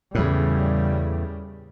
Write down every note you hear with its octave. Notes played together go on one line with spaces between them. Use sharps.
E2 A2 C#3 G3